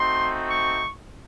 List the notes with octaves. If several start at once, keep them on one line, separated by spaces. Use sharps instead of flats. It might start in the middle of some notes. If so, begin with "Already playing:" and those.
Already playing: A3 C4 D#4 F#4 C6
C#6